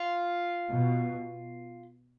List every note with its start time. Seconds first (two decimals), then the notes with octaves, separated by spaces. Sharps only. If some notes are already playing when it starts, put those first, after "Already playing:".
Already playing: F4
0.72 B2